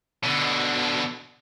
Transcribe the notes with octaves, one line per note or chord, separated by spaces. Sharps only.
B2 D3